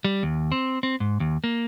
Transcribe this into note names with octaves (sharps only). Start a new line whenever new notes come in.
G3
D#2
C4
C4
G#2
D#2
A#3